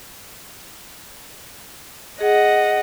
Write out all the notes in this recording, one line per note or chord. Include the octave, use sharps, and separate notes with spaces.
G#4 D#5 F#5